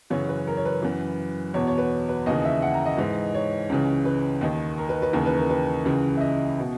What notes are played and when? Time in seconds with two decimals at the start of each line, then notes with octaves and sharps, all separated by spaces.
0.10 F#2 C#3 E3 C#5
0.29 B4
0.47 A#4
0.57 C#5
0.65 B4
0.82 F#2 E3
1.54 E2 B2 C#5
1.67 C#5
1.78 B4
2.09 B4
2.26 D#2 C#3 E3 D#5
2.45 E5
2.62 F#5
2.74 A#5
2.86 D#5
2.98 G#2 E3
3.34 C#5
3.69 C#2 C#3 E3
4.05 B4
4.41 D#2 D#3
4.78 A#4
4.89 B4
5.02 B4
5.13 D#2 C#3 E3 A#4
5.26 B4
5.37 A#4
5.50 B4
5.85 C#2 C#3 E3
6.17 E5
6.21 D#5
6.59 B2